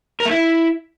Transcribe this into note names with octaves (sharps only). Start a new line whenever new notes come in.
A#4
A3
E4